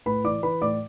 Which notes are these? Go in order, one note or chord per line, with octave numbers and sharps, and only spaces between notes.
A2 B4 B5
E3 D5 D6
E3 B4 B5
A2 D5 D6